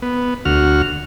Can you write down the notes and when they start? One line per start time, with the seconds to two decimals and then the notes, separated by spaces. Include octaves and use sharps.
0.02 B3
0.45 D2 F#4 F6